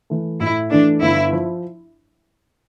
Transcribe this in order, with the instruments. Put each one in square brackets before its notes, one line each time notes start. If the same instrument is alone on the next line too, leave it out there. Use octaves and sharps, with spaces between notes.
[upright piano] E3 A3
[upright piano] A2 [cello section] E4
[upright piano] E3 A3 [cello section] D4
[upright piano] G1 [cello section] E4
[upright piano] F3